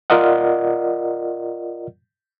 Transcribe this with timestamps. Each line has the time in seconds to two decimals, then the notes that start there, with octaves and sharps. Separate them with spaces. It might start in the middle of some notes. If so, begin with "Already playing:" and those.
0.10 F4 A#4 D5 D#5 F#5